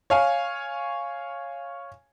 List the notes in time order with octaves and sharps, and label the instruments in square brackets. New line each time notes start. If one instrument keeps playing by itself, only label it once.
[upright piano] C#5 F5 G#5